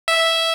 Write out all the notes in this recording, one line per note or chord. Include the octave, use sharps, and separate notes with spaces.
E5